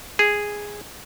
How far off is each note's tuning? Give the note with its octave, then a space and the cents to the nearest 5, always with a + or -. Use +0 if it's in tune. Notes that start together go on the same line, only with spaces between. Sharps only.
G#4 -5